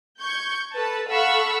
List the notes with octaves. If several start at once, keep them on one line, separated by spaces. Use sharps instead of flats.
C#6 G6 G#6
A4 B4 A5
A4 F5 F#5 B5 C#6 E6